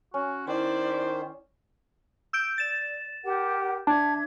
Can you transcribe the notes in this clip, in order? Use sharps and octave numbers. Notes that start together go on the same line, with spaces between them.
C#4 F#4
D#3 E4 C5 D5
E6 G6 D7
D5 A6 E7
G4 A#4 F#5
D4 D5 E5 A5 G#6